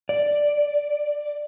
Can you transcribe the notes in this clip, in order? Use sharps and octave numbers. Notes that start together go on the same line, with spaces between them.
D5